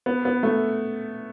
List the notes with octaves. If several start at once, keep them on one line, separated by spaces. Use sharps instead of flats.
B3
B3
A3